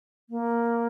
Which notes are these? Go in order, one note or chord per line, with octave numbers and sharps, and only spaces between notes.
A#3